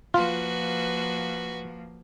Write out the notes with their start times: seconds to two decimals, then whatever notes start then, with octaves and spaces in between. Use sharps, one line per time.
0.14 F3 A#3 F4 F#4 B4